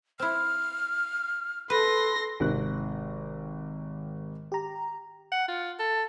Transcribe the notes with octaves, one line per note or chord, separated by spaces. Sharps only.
C4 E4 F6
A4 B4 C6 A#6
G#1 C3 D#3 F#6
G4 A#5
F#5
F4
A4